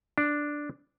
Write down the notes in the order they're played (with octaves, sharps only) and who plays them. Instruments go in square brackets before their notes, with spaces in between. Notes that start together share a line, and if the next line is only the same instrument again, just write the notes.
[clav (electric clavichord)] D4